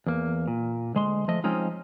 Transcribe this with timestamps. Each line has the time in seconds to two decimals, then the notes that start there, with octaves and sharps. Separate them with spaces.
0.06 E2 A#3
0.48 A#2
0.95 D2 G#3 C6
1.28 F3 A3 D#5
1.44 F3 G#3 C4 C#4 D#4 F4